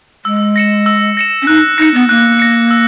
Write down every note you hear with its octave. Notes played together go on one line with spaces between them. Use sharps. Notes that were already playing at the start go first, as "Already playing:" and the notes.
G#3 E6
A#6 C#7 E7
E6
A#6 C#7 E7
C#4
D#4 F#6
D#4 A#6 C#7
B3
A#3 F#6
A#6 C#7
E6